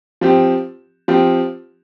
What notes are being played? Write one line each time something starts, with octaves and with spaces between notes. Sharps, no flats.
F3 C4 G4
F3 C4 G4